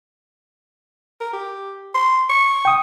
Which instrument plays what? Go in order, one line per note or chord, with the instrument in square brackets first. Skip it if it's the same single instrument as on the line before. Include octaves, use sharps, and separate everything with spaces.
[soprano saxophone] A#4
G4
C6
C#6
[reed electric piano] G5 D#6